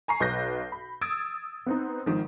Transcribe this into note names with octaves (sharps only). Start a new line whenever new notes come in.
G#5 A#5 C#6 C7
B1 B4 G6 A#6
B5
D#6 E6 G#6 A6 D7
B3 C4 D#4
G#1 D#3 F3